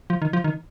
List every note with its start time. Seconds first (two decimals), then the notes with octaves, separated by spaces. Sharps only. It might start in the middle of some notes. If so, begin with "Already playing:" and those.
0.10 F3
0.22 D#3
0.33 F3
0.44 D#3